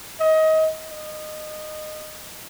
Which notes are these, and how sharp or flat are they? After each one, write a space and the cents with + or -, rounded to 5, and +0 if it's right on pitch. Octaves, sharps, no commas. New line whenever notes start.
D#5 +25
D#5 -15